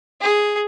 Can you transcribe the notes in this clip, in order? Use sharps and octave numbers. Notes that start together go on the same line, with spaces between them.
G#4